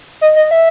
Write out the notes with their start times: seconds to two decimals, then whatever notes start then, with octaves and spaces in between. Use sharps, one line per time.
0.21 D#5
0.36 D#5
0.51 E5